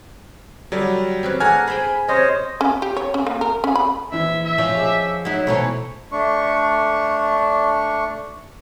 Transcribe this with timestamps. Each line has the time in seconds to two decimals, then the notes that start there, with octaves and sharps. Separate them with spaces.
0.72 D3 F#3 G3
1.23 C4 C#4 B4
1.40 G#3 A3 D4 F#5 G#5 A#5 F6 G#6
1.68 G#4 C5 G5 B5
2.08 C3 C#4 C5 C#5 D#5
2.61 C#4
2.82 G4
2.97 C#5
3.14 C#4
3.27 A#3
3.41 A#4
3.64 C#4
3.75 B5
4.12 A#1 E3 E5
4.45 E5
4.58 F3 C#4
4.75 G#4 D#5 D6
5.25 F#3 D#4 E4
5.47 B2 E3 A3 C5 C#5 A#5 C#6
6.12 A3 D4 C#6